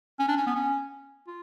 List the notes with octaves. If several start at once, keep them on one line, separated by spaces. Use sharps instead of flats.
C#4
D4
C#4
B3
C#4
F4